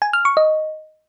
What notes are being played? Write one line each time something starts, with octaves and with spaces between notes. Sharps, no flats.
G#5
F6
C#6
D#5